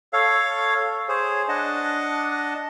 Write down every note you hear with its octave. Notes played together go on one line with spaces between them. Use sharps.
A4 C#5 F5
G#4 C5 C#5
D4 D#5 F#5 A5